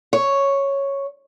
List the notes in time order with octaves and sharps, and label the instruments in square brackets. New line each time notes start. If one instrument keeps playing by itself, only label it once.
[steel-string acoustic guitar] C#5